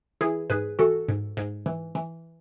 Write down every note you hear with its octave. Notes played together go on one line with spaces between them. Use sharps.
E3 E4 G#4
G#2 G#4 B4
E3 F#4 A4
G#2
G#2
E3
E3